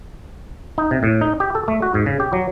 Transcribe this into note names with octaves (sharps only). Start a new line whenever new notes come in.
D#4
C3
A2
D#4
G4
A4
A3
F#4
G#2
C#3
G4
F#3